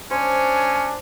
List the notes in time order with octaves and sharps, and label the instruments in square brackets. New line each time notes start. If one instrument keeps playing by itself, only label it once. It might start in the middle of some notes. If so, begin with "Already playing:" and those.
[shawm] C#4 [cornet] D4 [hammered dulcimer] C5 [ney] G#5